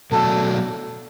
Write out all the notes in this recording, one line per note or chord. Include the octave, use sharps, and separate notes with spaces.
B2 F#3 A3 D4 A4